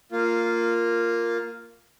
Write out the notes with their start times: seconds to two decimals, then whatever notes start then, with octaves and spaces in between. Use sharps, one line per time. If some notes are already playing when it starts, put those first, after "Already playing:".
0.12 A#3 F4